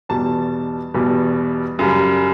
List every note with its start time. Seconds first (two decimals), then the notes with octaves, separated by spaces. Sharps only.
0.09 E2 B2 G3 A5
0.94 E2 B2 G3
1.79 F#2 C#3 G3